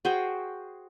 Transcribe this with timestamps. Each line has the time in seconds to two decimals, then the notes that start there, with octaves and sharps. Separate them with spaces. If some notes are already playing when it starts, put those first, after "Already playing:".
0.05 F#4 G#4 C5 G5